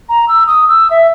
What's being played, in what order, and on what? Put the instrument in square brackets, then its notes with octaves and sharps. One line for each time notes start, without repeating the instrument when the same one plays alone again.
[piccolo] A#5
E6
D#6
E6
E5